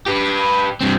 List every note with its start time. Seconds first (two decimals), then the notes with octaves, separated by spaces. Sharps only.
0.06 G4 B4
0.81 G2 C4